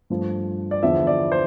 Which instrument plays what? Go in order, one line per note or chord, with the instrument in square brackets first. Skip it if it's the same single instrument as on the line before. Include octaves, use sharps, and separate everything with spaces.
[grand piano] G2 F3 A3
D5
E2 D3 F3 B3 E5
D5
C5